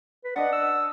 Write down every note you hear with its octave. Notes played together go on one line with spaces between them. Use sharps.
B4
D4 D#5 F#5
E6